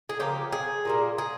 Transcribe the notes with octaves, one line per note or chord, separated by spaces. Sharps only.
G#4
C#3 F3 A#3 G4
G#4
A#2 G3 A#3
G#4